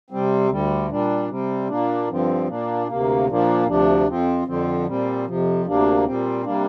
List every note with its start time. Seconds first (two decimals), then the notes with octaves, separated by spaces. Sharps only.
0.10 C3 G3 C4
0.49 D2 D3 G3
0.89 A#2 G3 D4
1.29 C3 G3 C4
1.69 A#2 A#3 D4
2.08 G2 D3 F3 C4
2.47 A#2 A#3 D4
2.87 D2 C3 A#3
3.27 A#2 F3 A#3 D4
3.66 D2 C3 F3 D4
4.07 F2 F3 C4
4.46 F2 D3 F3 C4
4.86 A#2 G3 C4
5.26 F2 C3 F3
5.66 D2 C3 A#3 D4
6.05 A#2 G3 C4
6.44 C3 G3 A#3 D4